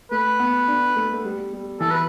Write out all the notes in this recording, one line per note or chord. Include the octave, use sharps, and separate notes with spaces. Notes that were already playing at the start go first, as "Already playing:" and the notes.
A3 B4
B3
D4
A3
A3
G3
G3
E3 A4
B4